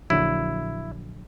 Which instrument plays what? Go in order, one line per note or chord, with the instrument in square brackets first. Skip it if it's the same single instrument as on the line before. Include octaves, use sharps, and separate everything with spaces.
[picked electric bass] A#1 D3 F#3 [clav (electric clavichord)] E4